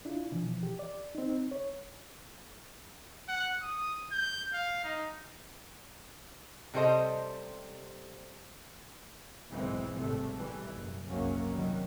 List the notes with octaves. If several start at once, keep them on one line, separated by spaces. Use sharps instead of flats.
D4 E4 F4
B2 E3 F3
G4
D5
C4 D#4
C#5
F#5
D#6
G6
F5
D#4
C3 G3 A4 C5 D#5
B1 G#2 E3 G#3 C4
G#1 A2 C3 G3 A3
B2 E3 G3
F#1
F#1 C2 F#2 F#3 A#3 C#4
C3 D#3 F#3 G3